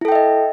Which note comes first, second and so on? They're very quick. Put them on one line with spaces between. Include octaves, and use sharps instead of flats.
E4 A4 G5 E5 D#5